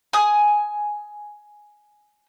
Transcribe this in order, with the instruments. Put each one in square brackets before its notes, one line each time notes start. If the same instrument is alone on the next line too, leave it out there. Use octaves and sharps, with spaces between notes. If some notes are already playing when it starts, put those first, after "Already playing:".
[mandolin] G#5 D#6